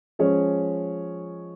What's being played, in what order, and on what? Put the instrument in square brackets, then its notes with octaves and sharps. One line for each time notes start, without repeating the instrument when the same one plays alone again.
[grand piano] F3 G#3 C#4 G#4 C#5